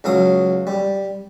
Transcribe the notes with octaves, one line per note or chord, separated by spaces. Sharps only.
C#2 F#3 F5 D#6
G3